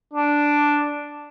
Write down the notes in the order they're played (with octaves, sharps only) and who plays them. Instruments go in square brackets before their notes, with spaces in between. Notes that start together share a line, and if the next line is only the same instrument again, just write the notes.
[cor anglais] D4